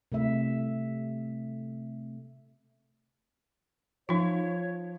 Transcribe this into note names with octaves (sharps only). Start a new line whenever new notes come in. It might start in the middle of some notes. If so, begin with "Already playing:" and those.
C3 A3 E5
F3 D#4 F4 C#5